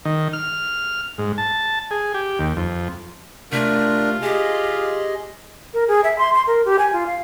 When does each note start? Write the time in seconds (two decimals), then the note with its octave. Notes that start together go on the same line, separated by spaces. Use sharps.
0.05 D#3
0.33 F6
1.18 G#2
1.38 A5
1.91 G#4
2.14 G4
2.39 D#2
2.57 F2
3.52 C3 A3 D4 F4 A#4
4.22 G4 G#4 D#5
5.74 A#4
5.88 G#4
6.04 E5
6.18 C6
6.34 C6
6.47 A#4
6.65 G4
6.79 G#5
6.93 F4
7.06 F5